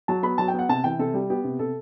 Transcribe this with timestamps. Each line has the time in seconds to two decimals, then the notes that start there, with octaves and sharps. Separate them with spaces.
0.08 F#3 A5
0.23 B3 B5
0.38 F#3 A5
0.48 G5
0.54 B3
0.59 F#5
0.69 C3 A5
0.84 E3 G5
0.99 C3 A4
1.14 G3 G4
1.30 B3 G4
1.44 C3
1.59 C3 A4